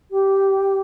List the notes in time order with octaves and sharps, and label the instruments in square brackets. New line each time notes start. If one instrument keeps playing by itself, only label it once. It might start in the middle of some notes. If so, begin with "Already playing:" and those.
[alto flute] G4